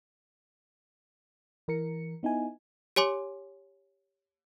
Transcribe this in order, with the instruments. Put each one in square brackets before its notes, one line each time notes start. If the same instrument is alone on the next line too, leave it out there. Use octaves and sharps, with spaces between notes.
[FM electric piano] E3 A#4 A#5 C#7
B3 D#4 E4 G#5
[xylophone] G4 C#5 G#5 C6 D6